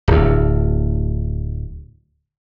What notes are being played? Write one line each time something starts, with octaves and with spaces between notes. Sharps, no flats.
D1 D2